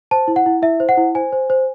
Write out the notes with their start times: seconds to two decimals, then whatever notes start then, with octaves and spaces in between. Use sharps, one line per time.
0.11 C5 A5
0.28 E4
0.36 F#5
0.46 E4
0.62 E4 E5
0.80 C5
0.89 F#5
0.97 E4
1.15 C5 G#5
1.33 C5
1.50 C5